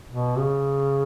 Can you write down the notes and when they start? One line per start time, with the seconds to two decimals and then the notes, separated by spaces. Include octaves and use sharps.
0.11 B2
0.36 C#3